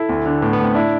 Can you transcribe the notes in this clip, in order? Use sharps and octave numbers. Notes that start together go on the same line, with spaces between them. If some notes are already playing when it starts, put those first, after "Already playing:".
Already playing: E4 A4
D2
D3
A2 B3
B3
A2 C4
D4 E4